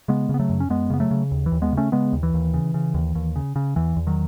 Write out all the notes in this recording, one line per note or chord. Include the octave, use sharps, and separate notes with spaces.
C#3 G#3 B3
C#3
B3
F#3 A3
F#2
C#4
F#2 G#3 B3
C#3 B3
F#3 A3
C#3
D#2
E3
D#2
G#3 B3
C#3
A3 C#4
C#3 G#3 B3
D#2
E3
D#2
C#3
C#3
D#2
D#2
C#3
C#3
E2 E3
E2
D#3 F#3